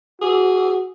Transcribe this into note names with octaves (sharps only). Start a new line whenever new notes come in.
F#4 G#4